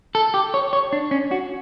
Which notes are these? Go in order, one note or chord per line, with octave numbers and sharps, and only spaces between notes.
A4
G4
C#5
C#5
D4
C#4
F#4